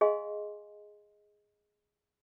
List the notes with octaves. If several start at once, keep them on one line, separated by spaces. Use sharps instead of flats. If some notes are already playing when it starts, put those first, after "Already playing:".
G#4 D#5 F5 G#5 C6